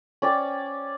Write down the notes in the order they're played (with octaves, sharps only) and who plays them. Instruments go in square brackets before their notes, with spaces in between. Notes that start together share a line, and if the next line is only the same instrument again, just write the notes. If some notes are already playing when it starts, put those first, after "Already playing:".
[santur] C#4 D5 G5